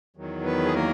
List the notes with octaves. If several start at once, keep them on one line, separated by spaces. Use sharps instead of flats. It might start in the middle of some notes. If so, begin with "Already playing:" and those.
E2 D#3 F#3
B3 B4
G#4
A#3 A#4